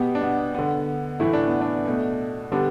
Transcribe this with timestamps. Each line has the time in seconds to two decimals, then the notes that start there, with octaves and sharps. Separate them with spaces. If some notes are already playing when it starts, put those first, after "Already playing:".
Already playing: B2 B3 G4
0.15 D4
0.21 B3
0.54 D3 B3
1.20 A2 E3 A3 E4
1.33 D4
1.47 B3
1.61 D4
1.85 B2 A3
2.52 D3 G3 B3 D4